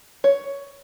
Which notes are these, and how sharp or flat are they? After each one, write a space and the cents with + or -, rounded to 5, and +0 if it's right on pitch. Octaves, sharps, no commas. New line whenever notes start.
C#5 +10